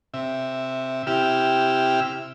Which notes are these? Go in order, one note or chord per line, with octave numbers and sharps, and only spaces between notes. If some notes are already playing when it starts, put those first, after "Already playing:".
C3 E5
C3 E4 G4 E6 F6